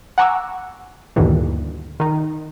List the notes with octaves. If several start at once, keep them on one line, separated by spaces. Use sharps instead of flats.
F#5 G#5 A#5 C#6 D6 E6
D2 G2 A#2 D#3 E3
D#3 D#4